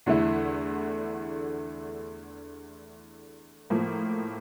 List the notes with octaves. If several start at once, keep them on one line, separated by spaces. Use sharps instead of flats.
E2 D3 A3 E4
A2 F3 A#3